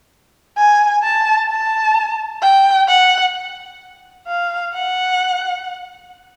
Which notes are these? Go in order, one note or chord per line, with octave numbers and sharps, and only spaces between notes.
G#5
A5
A5
G5
F#5
F5
F#5